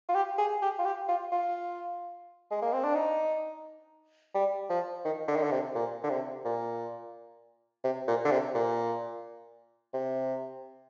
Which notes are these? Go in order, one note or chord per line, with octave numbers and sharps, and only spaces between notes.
F4
G4
G#4
G4
F4
G4
F4
F4
G#3
A#3
C4
D4
D#4
G3
F3
D#3
D3
D#3
D3
C3
A#2
D3
C3
A#2
C3
A#2
D3
C3
A#2
C3